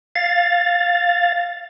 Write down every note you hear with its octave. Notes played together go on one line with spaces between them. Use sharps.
F5 A6